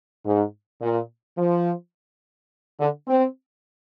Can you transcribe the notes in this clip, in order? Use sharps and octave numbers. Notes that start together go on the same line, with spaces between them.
G#2
A#2
F3
D3
C4